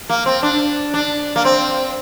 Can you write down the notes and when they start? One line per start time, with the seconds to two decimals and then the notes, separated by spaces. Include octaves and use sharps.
0.09 A#3
0.26 C4
0.43 D4
0.94 D4
1.36 A#3
1.45 C4